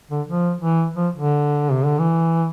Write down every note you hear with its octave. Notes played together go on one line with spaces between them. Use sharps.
D3
F3
E3
F3
D3
C3
D3
E3